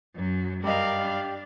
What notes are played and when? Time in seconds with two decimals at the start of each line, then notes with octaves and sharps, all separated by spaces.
0.14 F#2 F#3
0.64 G2 G4 A#4 D5 D#5 F5
1.01 D4